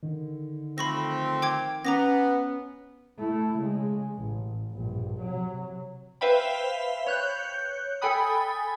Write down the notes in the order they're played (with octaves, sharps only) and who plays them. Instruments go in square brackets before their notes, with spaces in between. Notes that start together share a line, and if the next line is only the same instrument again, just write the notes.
[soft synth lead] D3 [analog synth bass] D#3
[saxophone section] F3 A3 C4 [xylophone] B5 C#6 A#6
[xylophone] G5 D6 G#6
[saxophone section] B3 [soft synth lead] C#4 [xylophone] A#5 D6 A#6
[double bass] A3 E4
C#3 G#3
A1
A#1 G2
C3 F#3
[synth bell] B4 C5 E5 F5 G5 B5
C#5 F#6 G6
A4 G5 G#5 B5 D#6